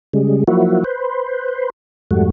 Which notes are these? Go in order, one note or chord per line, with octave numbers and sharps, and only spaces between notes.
C#3 G3 G#3
F3 F#3 A#3 E4 F#4
B4 C5
F2 G#2 G3 A3 F#4